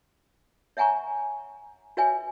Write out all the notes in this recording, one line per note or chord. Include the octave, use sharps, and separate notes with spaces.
C#5 E5 F#5 G#5 A#5 C#6
F#4 B4 C#5 E5 G5 G#5